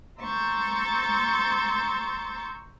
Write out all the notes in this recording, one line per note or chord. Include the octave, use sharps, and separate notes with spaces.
A#5 C6 C#6 E6 G6 A6